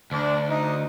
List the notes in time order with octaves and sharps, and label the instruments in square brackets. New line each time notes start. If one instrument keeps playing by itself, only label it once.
[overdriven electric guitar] D2 [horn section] D4
[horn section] D#4